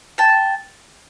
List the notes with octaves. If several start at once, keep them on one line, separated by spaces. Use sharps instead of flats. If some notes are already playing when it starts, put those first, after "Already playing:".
G5 A5